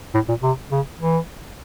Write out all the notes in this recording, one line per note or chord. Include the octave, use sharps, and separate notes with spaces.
A2
A#2
C3
C#3
E3